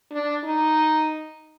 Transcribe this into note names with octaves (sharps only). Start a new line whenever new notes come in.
D4
D#4